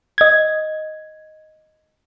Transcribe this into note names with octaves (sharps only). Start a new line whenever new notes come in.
D#5 G#6